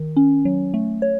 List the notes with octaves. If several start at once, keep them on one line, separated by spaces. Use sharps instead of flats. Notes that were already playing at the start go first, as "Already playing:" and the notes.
Already playing: D#3
C#4
F#3
A3
C#5